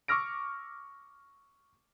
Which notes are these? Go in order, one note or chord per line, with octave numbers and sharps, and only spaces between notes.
C#6 D6 E6 F6 A#6 D7